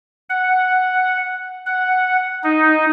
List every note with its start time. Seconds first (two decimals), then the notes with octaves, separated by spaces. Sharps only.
0.30 F#5
1.66 F#5
2.44 D#4